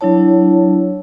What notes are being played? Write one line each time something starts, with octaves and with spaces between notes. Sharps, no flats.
F#3 D4 E4 C#5 A5